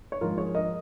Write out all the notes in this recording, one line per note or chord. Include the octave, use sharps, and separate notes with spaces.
C#5
G#2 F3 G#3 F4 A#4
G#4 C#5
A#4 D#5